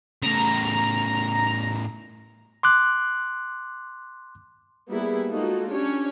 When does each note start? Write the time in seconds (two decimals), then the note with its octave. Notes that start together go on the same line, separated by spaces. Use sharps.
0.23 A2 C#3 A#5
2.63 C6 D6 F#6
4.89 G3 A#3 B3 E4 G#4
5.29 G#3 A#3 D#4 F4 F#4 A4
5.71 C#4 D4 G4 C#5